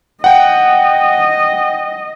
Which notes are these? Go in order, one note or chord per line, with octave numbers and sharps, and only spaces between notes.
D#5 F#5 G5